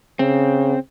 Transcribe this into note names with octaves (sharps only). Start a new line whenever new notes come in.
C#3 C4